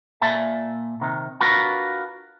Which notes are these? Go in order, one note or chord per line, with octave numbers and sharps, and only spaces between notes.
A#2 E5 G#5 A5
C3 D#3
D4 F4 F#4 A#4 B4